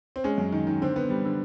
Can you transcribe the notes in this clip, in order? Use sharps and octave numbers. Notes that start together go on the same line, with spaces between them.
C4
G#3 C#4
F#2
D#3
D#3
D3 C4
B3
G3
D3